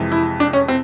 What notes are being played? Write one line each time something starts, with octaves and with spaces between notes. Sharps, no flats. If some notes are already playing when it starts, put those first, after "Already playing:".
Already playing: F2 C3 E3 G#3
E4
D4
C#4
C4